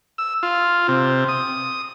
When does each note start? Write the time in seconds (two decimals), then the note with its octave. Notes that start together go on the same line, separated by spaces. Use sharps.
0.18 E6
0.43 F4
0.88 C3
1.29 D#6